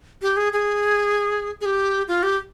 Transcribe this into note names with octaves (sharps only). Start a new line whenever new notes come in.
G4
G#4
G#4
G#4
G4
F4
G4